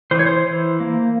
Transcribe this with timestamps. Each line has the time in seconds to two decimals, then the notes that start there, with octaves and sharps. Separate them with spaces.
0.11 E3 C5
0.19 C#5
0.26 C5
0.46 E3
0.80 A#3